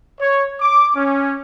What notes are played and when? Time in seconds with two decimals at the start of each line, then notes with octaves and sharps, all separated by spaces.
0.20 C#5
0.59 D6
0.95 C#4